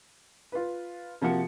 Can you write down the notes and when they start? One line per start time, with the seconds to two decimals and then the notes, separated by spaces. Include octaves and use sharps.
0.52 F4 B4
1.22 C3 F3 A#3 F#4 C#7